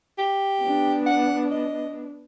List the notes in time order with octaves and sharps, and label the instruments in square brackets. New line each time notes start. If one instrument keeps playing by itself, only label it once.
[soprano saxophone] G4
[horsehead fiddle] B3 D4
[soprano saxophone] F#5
D#5